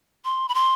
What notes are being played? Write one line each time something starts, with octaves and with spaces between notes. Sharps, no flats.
C6
B5
C6